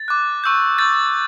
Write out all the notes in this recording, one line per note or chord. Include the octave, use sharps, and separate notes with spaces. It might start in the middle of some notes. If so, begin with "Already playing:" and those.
Already playing: A6
D6 F#6
C#6 E6 G6
C#6 E6 G6 A6